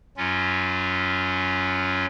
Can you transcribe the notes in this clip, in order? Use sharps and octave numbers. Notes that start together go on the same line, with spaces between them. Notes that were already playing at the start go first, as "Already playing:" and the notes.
F#2 F#3 C#4 F4